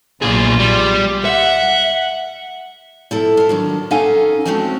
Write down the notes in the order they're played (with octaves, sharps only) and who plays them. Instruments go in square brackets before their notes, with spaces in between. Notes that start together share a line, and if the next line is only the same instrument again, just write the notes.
[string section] B1 F4 [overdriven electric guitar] A#2 G#4
[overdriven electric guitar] G3
[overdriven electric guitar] E5 [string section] F#5
[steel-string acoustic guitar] F3 E4 A4
E4 F4
D3 D#3 F#3
C#4 D#4 A4 F5 F#5 G#5
F3 G#3 A3 C4 C#4 F#4